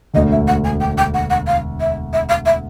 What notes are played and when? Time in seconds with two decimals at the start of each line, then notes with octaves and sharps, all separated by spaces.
0.14 E1 D2 D3 D#5
0.31 E5
0.47 F#5
0.64 G#5
0.80 G5
0.97 G5
1.14 F#5
1.30 F#5
1.47 F5
1.80 E5
2.13 E5
2.29 F5
2.45 E5